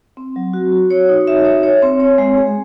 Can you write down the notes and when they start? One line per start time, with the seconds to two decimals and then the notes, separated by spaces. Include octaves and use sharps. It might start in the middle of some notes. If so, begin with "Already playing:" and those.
0.17 C4
0.36 F#3
0.53 F#4
0.72 F#4
0.90 C#5
1.09 D#4
1.27 E5
1.45 C#5
1.63 C#5
1.82 C4
2.00 C#5
2.18 G#3
2.37 G#4